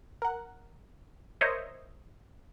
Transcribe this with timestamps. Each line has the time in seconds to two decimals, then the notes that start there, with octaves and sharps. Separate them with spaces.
0.22 A#4 F#5
1.41 A#4 C5 C#5 D#5 E5